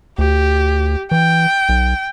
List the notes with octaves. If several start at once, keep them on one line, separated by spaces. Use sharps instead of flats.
D2 G4
E3 G5
B1